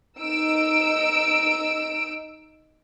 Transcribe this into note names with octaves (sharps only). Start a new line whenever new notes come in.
D#4 E6 D7